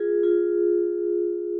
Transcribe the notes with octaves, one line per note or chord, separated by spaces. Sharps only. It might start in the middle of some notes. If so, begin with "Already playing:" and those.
Already playing: F4 G#4
F4 G#4